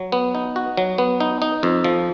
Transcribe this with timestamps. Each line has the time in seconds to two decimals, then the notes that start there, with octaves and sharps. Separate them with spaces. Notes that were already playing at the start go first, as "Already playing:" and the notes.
Already playing: F#3
0.12 B3
0.35 D#4
0.56 F#4
0.77 F#3
0.98 B3
1.20 D#4
1.42 D#4
1.63 F2
1.84 F3